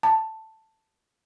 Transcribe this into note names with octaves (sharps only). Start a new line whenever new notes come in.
A5